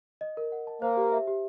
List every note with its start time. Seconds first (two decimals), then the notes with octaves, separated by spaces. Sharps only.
0.21 D#5
0.37 A#4
0.52 F#5
0.67 A5
0.82 A#3 C5
0.97 G4
1.12 E5
1.28 G4